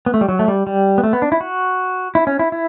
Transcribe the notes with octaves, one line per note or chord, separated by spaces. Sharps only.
B3
A3
G3
F#3
A3
G3
G3
B3
A3
B3
D4
E4
F#4
E4
C#4
E4
E4